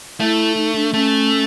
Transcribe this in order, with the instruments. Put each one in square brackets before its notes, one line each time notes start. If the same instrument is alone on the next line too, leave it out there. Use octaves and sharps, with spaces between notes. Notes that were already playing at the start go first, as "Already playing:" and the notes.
[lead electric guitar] A3 [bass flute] E4
[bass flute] D#4
D4
[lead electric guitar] A3 [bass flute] C#4